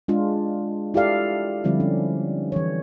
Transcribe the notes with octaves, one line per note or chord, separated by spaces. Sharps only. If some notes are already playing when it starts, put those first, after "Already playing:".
G#3 D4 F4
E4 F4 G4 A4 D5 F5
D3 F3 G3 C4 E4
C#4
E3 C#5